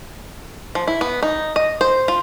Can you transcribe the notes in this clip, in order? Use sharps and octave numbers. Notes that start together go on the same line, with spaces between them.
F3
E4
B3
D#4
D#5
C5
F4